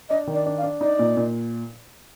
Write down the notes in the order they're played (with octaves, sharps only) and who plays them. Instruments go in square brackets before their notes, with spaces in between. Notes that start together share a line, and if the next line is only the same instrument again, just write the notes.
[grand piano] D4 [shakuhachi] D#5
[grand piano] D#3
[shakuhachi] D5
[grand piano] D4
[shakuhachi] F5
[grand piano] D4
[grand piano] D#4 [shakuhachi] D5
[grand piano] A#2
A#2